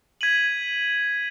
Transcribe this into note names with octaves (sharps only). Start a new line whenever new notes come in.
G#6 B6 D#7 F#7